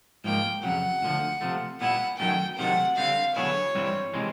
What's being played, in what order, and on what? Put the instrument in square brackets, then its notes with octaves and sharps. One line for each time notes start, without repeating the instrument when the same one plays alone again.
[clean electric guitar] G#2 F3 A#3 [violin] G5
[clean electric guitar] F2 C#3 F#3 [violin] F#5
[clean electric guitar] D2 D3 F3
C3 F3 A3
[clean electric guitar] A#2 G3 B3 E4 [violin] F#5
[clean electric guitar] F#2 D#3 F#3 A3 C#4 [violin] G5
[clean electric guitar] C3 D#3 F#3 A3 [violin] F#5
[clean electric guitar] D3 G3 C4 [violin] F5
[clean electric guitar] D3 F#3 B3 E4 G#4 [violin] C#5
[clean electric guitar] G2 E3 G3 C4 E4
C3 E3 G#3 C4